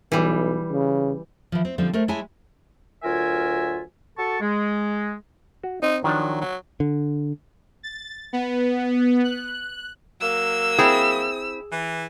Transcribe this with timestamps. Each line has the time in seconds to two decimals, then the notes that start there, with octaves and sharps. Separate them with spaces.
0.12 B1 E3 G3
0.72 C#3
1.52 E3 F3
1.65 C4
1.78 D3 F3 G3 C4
1.93 A3 A#4 C5
2.08 G#3 E4 C#5 G#5 A5
3.04 D2 F#3 F4 A#4 E5 G#5
4.18 F#4 A4 A5 C#6
4.41 G#3
5.64 F#4
5.83 C4 D#4
6.04 D#3 F3 F#3 D4
6.41 F#3
6.80 D3
7.83 A6
8.33 B3
9.24 F#6
10.21 F#3 A#3 E6
10.79 C4 E4 G#4
11.71 E3